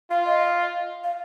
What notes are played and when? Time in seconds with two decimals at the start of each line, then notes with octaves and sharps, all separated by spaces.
0.11 F4 F5
0.26 D#5
1.04 F5